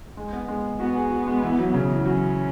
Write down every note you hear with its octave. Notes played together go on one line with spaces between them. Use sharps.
G#3
B3
G#3
B3 F#4
G#4
F#4
G#3
E3
F#3
C#3
E3
F#3 C#4